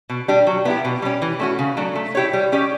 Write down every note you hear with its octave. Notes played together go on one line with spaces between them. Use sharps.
B2
G3 D4 G4
F#3
B3 E4 G4
B2
G3 C#4 G4
E3
A3 C#4 F#4
C#3
F#3 A3 D4
A3
E4 G4 C#5
G3
C#4 G4 D5